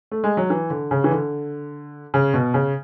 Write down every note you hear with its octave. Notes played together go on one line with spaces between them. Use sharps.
A3
G#3
F#3
E3
D3
C#3
E3
D3
C#3
B2
C#3